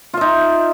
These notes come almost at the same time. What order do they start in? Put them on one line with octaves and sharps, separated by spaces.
F4 E5 D#4